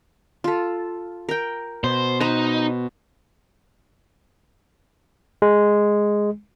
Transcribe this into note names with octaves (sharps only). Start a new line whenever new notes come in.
F4 A4
A#4 G5
B2 C5
D#4 B4 C5
G#3